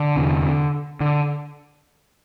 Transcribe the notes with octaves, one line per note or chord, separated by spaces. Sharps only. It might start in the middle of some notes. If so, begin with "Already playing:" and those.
Already playing: D3
E2 C3
D3